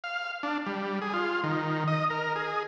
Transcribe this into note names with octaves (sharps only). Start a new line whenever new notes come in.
F5
D4
G3
G#4
F4
D#3
D#5
A#4
G#4